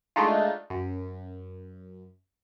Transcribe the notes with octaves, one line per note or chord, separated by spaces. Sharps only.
G#3 A3 D4 D#4 F4
F#2